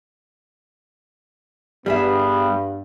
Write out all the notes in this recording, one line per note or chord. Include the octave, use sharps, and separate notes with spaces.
G2 G3 B3 G#4 E5